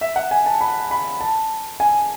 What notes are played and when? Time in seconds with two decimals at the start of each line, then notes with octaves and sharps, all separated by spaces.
0.01 E5
0.16 F#5
0.31 G#5
0.46 A5
0.61 B5
0.91 B5
1.21 A5
1.80 G#5